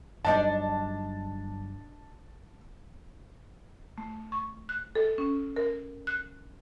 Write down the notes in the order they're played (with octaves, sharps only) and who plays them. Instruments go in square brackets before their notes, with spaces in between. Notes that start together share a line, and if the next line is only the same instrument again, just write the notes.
[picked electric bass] G1 F#3 G3 [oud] D4 D#4 D5 [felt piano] A5
[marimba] A3
C#6
F#6
A4
C#4
A#4
F#6